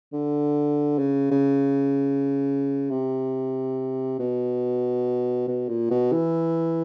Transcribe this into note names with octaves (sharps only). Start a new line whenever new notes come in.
D3
C#3
C#3
C3
B2
B2
A#2
B2
E3